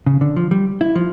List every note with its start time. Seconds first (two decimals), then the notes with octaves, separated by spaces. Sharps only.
0.06 C#3
0.21 D3
0.36 F3
0.51 G3
0.81 E4
0.95 F3